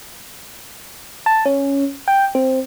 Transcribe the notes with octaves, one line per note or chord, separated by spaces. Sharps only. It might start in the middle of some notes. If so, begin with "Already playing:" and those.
A5
C#4
G5
C4